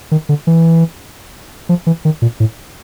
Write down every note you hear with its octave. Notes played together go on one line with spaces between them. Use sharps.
D#3
D3
E3
F3
E3
D#3
A#2
A2